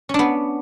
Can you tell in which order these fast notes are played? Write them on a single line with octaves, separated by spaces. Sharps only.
C#4 D4 B3